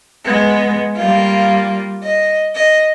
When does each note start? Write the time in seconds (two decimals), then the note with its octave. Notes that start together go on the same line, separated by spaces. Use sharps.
0.24 G#3 B3
0.97 G3 A#3 F4
2.03 D#5
2.55 D#5